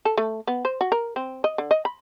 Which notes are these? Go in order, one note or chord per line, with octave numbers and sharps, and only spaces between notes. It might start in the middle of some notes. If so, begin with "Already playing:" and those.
A4
A3
B3
C5
F#4
A#4
C4
D#5
D3
D#5
B5